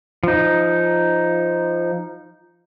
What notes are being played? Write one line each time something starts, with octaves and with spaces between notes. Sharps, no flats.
F3 D#4